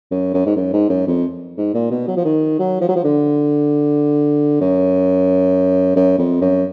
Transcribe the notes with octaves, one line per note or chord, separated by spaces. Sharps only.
F#2
F#2
G#2
F#2
G#2
F#2
F2
G#2
A#2
B2
F#3
F3
D#3
F#3
F3
F#3
F3
D3
F#2
F#2
F2
F#2